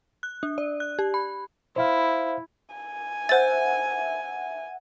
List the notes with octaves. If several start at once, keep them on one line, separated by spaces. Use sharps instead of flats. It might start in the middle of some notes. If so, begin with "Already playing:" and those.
F#6
D4
D5
F#6
G4
B5
E4 C5 E5 F5
G#5
C5 E5 F#5 A6